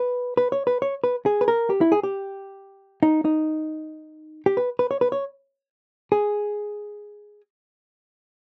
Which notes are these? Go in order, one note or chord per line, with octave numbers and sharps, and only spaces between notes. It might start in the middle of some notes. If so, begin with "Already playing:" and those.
Already playing: B4
B4
C#5
B4
C#5
B4
G#4
B4
A#4
G4
E4
G#4
G4
D#4
D#4
G4
B4
B4
C#5
B4
C#5
G#4